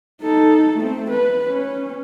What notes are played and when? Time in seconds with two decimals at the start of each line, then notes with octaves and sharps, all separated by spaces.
0.22 D#4 A4
0.77 A3 C4
1.10 B4
1.48 C#4